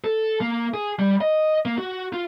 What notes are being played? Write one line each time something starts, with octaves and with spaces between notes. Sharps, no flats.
A4
A#3
G#4
G3
D#5
A#3
F#4
F4